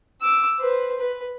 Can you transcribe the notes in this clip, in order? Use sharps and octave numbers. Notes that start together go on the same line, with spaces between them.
D6 E6
B4 C5
B4